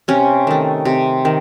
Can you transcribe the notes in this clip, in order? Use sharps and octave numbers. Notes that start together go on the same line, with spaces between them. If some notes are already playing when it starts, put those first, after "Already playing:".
C3 C#4
D#3 A3
C3
D#3